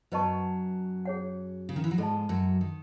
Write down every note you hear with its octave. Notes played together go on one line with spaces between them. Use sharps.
F#2 F#3 B4 D#5 A5 C#6
G#4 C#5 F#5
C#3
D#3
E3
F#3
G#2 G#3 A4 D#5 A5
F#2 F#3
D#3